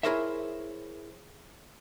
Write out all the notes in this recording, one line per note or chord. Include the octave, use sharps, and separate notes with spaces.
E4 G#4 A#4 C5 C#5 E5